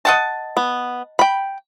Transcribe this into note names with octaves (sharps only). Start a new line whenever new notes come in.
D#5 F#5 A5
B3
G5 B5